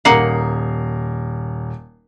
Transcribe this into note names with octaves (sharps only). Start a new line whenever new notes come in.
D#1 A#3 D#4 A#4 F#5 C7